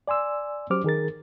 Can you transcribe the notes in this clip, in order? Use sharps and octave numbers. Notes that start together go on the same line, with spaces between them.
D5 G#5 C6 E6
F#3 C#4 G4 C5 D6 F6
D#3 G#4 A#4 A6